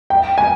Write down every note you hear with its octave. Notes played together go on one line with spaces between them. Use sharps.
G5
G#5